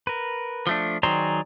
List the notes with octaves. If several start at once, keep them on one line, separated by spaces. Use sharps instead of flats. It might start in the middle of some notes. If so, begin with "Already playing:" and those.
A#4 B4
F3 A3 D4
D#3 F#3 G#4 C5 D5 A#5